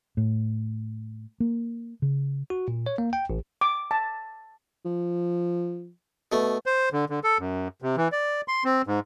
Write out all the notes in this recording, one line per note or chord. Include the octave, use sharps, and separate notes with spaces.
A2
A#3
C#3
F#4
A#2
C#5
A#3
G5
A1
D6
A5
F3
B2 A3
C5
D3
D3
A4
F#2
C3
E3
D5
C6
C4
G#2